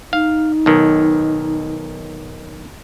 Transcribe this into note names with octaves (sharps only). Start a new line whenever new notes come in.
D#4 F5
B1 D#3